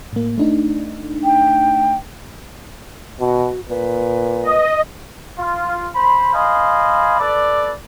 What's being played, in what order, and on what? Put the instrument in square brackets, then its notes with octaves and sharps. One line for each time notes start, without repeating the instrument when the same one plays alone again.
[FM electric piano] A2 A#3
A3 D4 D#4
[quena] G5
[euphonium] B2 [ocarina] F#4
[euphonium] A#2 [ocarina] B4
[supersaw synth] D#5
[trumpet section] F4
C5 B5
C5 D#5 F5 G#5 B5
A4 B4 D5